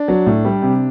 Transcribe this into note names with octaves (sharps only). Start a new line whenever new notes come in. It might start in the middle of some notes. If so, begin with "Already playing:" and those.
Already playing: D4
F#3
A2
G3
C3